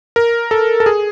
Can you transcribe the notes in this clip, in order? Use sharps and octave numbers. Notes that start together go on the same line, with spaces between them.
A#4
A4
A4
G#4